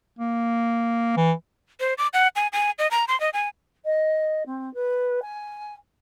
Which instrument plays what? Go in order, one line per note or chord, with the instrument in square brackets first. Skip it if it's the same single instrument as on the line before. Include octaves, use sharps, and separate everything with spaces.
[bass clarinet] A#3
E3
[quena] C5
D6
F#5
G#5
G#5
D#5
A#5
C6
D#5
G#5
[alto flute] D#5
C4
B4
G#5